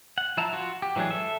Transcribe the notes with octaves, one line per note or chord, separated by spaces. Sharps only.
F#5
F3 E4 E5 A5 A#5
F4 F#4
G4
E3 F#3 G#3 D4 G#4
A4 E5